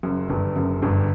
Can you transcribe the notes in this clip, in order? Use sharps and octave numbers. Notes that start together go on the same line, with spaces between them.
F#1 F#2
G1 G2
F#1 F#2
G1 G2